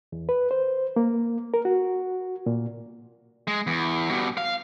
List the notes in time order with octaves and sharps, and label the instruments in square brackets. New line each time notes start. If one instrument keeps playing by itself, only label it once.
[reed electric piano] E2
B4
C5
A#3
A#4
F#4
A#2
[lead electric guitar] G#3
E2
B2 G3
F5